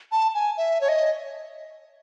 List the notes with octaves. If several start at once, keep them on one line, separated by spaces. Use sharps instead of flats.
A5
G#5
E5
C#5
D#5